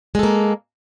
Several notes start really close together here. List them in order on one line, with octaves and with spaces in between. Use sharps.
G#3 A4 A#3